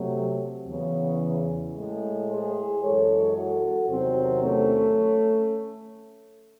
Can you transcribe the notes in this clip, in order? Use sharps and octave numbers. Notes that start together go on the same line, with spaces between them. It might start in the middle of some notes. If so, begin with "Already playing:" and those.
Already playing: C3 F#3 A3
E2 C#3 E3
A2 G#3
G#4 C5
F#2 E3 G#3 A4 C#5
F#4 A4
E2 C3 D#3 F#3 C4
A3 C#4